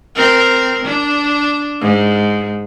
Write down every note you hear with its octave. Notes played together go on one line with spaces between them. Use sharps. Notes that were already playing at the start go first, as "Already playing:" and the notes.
C4 A#4
D4
G#2